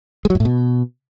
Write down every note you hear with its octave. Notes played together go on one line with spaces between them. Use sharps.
G#3
F#3
G#2
A2
B2